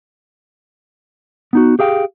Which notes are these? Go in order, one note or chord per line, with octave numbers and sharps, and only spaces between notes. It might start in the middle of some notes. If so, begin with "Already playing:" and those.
B3 D#4 F#4
G4 G#4 F5 G5